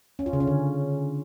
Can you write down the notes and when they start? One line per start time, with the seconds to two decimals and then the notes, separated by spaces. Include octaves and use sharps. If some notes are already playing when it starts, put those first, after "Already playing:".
0.19 C#4
0.26 F4
0.33 C#3
0.40 C#4
0.47 D3